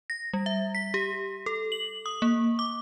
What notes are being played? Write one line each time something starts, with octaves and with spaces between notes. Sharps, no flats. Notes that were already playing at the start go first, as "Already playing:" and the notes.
A#6
G3
E5
B6
G4
A4
F#7
D#6
A#3
D6